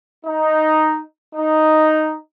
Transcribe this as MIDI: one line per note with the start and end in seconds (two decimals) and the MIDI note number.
0.25 0.99 63
1.33 2.13 63